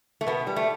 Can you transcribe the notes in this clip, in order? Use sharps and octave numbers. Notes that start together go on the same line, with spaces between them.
A3
B2 B3
G3
A3